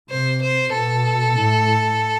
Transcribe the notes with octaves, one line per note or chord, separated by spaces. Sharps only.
C3 C5
C5
B2 A4
A2